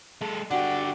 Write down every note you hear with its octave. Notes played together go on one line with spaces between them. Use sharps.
G#3 A4
D3 F#4 G4 D5 F#5